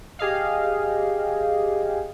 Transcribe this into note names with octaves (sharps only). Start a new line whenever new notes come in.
G4 G#4 D#5 F5